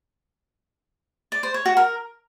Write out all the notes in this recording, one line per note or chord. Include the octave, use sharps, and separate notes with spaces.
D5
C5
C#5
F#4
A#4